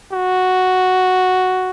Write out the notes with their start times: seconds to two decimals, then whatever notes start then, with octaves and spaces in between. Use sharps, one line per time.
0.12 F#4